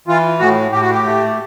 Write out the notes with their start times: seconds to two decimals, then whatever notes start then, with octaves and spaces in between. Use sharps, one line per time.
0.08 E3 F4
0.39 A2 F#4
0.71 A2 G4
0.81 F#4
0.91 G4
1.05 A3